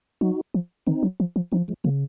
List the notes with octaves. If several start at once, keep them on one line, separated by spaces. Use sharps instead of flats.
F#3 D#4 F#4
F3
D#3 C4 D#4
F#3
F3
F3
F3 C4 D#4
F3 G#3
C#3 F#3 A#3